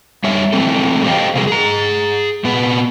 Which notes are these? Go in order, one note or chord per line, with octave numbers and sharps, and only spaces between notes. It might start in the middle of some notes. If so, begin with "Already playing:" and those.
G3 C#5 E5
E3 G#3 A3 B3 C4 A4
G4 A4 C5 D#5 F5 G5
C3 F3 G3 G4 G#4 A#4
G#4 A#5
A#2 B3 B4